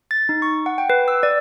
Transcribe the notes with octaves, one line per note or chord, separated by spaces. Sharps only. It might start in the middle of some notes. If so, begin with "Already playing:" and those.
A6
D#4
C#6
F#5
G5
B4
E6
D5